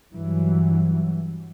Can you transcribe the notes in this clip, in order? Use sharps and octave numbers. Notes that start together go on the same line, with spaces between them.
G2 E3 F#3